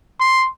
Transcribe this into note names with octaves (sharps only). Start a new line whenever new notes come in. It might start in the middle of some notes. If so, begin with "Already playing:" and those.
C6